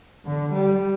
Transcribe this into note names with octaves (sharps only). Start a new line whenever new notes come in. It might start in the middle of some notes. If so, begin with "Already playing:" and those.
D3
G3